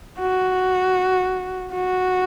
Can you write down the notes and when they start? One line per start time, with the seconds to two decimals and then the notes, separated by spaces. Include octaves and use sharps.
0.19 F#4
1.73 F#4